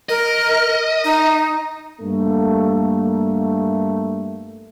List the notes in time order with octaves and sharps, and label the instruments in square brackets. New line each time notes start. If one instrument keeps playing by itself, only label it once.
[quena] A#4 [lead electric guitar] D#5
[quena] D#4
[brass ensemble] G2 A3 A#3